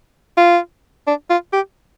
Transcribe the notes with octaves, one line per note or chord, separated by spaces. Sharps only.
F4
D4
F4
G4